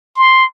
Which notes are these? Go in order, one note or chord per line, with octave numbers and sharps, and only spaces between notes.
C6